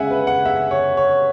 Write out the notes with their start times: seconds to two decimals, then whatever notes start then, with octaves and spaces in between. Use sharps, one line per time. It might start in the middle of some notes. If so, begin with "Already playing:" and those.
Already playing: C#3 G#3 E5 F#5 G#5
0.11 B4
0.27 F#5
0.45 E5
0.71 C#5
0.97 C#5